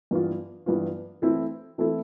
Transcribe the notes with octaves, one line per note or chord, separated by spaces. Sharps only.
G2 E3 B3 F4
G2 E3 B3 F4
E3 A3 C4 E4 A4
E3 A3 C4 E4 A4